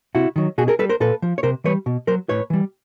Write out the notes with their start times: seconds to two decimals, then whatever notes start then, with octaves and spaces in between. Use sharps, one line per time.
0.15 C3 E4 F#4
0.36 D#3 F#3
0.58 B2 F#4 G#4
0.68 G#4 A#4
0.79 G3 A4 B4
0.89 A#4 C5
1.00 A#2 A4 B4
1.22 F3
1.38 C#5
1.43 C3 A#4 C5
1.64 E3 G3 B4 C#5
1.86 B2
2.07 F#3 A#4 C5
2.29 A2 B4 C#5
2.50 E3 G3